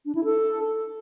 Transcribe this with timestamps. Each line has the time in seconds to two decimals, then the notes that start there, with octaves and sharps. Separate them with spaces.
0.06 D4
0.15 E4
0.24 A4